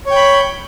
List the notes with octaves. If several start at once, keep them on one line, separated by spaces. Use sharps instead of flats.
C#5 G5 B5